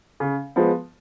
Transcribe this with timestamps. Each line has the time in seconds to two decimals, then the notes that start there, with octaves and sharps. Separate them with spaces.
0.20 C#3
0.56 F3 G#3 B3